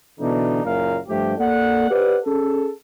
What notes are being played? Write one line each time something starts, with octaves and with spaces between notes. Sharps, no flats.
B2 D3 E3 D4 D#4
F#1 F#2 A#2 A#4 F5
G2 F3 A3 G4
A#3 A4 D5 F#5
G4 B4 C5 D5 F#5
C#4 G#4 A4